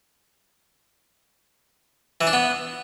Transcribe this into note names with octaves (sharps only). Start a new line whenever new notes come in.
E3
D4
B3